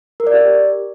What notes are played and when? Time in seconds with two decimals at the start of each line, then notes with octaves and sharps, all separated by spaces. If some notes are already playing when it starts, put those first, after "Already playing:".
0.20 A#4
0.27 D5
0.33 G4